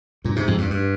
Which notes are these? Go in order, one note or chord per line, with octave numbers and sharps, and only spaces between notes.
G2 A#2
G#2 C3
F2 G#2
G2
G2